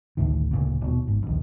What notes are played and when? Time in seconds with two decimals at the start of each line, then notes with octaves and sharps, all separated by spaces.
0.17 A1 D2 A2 D#3
0.51 D1 A#2 C#3
0.81 D#1 B2
1.07 G#1
1.23 A#1 D#2